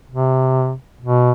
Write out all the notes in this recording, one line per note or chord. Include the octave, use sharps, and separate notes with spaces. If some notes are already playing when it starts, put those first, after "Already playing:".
C3
B2